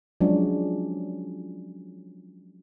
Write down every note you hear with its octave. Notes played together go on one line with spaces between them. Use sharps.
F3 F#3 G#3 C#4 D4